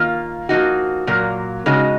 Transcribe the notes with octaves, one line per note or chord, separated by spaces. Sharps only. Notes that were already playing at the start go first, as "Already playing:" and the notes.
Already playing: D#3 A#3 F4
F3 A#3 D#4 F#4
A#2 F#3 A#3
C#3 G#3 D#4 F#4